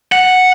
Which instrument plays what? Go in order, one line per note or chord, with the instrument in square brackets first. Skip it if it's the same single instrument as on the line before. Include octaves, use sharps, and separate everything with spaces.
[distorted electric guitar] F#5